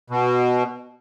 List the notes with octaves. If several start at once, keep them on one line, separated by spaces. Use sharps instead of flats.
B2